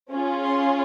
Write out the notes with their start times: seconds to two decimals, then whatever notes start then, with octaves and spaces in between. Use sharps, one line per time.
0.12 C#4 F4 G#4
0.43 C6